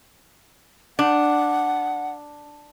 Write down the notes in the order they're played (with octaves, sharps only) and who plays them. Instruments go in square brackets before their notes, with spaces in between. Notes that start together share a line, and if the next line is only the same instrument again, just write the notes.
[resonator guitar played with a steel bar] D4 [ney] F#5